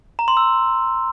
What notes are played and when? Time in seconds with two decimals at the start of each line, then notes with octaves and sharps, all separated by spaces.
0.19 A#5
0.28 C6
0.37 E6